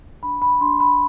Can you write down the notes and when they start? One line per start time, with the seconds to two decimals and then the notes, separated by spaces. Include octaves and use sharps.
0.23 D4 B5
0.42 B5
0.61 D4 C6
0.80 B5